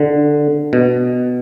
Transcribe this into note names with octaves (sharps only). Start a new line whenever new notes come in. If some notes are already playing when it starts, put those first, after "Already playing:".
Already playing: D3
B2